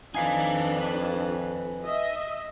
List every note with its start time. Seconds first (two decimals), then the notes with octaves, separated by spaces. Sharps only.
0.14 F2 D4 D#4 B4 F5 G#5
1.84 D#5 E5